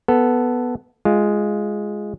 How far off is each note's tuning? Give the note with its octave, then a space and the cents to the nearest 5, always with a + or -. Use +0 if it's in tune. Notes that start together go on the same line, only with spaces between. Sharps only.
B3 +0 A4 +0
G#3 +0 F4 -10